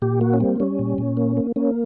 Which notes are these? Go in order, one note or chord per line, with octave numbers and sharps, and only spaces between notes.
A#2 G4
A#3 F#4
C#4
G3 C4
G3 C#4
A#2
A#2
A#3
A#3
A#3 C#4